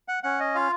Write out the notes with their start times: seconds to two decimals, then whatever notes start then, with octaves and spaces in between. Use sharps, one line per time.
0.08 F#5
0.23 C#4 F#5
0.40 D#5
0.55 F4 F5